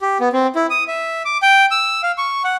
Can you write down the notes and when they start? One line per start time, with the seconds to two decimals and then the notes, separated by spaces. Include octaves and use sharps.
0.01 G4
0.20 B3
0.33 C4
0.55 E4
0.70 D#6
0.88 E5
1.25 D6
1.42 G5
1.71 E6
2.03 F5
2.18 C#6
2.44 F#5